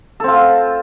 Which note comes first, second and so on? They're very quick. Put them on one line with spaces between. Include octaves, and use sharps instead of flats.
A4 C4 F4